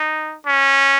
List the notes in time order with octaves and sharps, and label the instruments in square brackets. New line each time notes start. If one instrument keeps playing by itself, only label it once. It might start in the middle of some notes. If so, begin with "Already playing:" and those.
Already playing: [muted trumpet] D#4
C#4